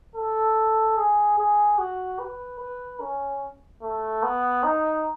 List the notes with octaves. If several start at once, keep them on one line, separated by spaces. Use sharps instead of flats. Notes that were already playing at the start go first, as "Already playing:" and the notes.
A4
G#4
G#4
F#4
B4
B4
C#4
A3
B3
D#4